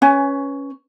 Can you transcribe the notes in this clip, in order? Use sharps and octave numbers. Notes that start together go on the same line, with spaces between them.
C#4 B4 G#5